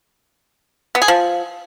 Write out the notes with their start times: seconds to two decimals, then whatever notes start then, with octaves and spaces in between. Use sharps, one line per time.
0.95 B3
1.02 G#4
1.08 F3